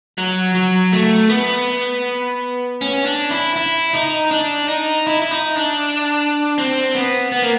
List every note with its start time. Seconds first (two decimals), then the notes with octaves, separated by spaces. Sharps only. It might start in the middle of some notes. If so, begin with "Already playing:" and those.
0.18 F#3
0.55 F#3
0.92 A3
1.30 B3
2.81 C#4
3.06 D4
3.30 E4
3.56 E4
3.93 D#4
4.31 D4
4.68 D#4
5.07 E4
5.22 E4
5.31 D#4
5.57 D4
6.58 C4
6.95 B3
7.32 B3
7.42 A#3